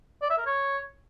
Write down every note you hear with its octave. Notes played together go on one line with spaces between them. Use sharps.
D5
E5
A#4
C#5